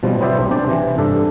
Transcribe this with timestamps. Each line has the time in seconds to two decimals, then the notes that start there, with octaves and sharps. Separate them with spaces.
0.03 B2 F3 G3 C4
0.20 F#3 B3 C4 C5 D5 E5
0.38 B1
0.51 C4 D4 C5 D5
0.66 C3 E3
0.98 G2 A4 D5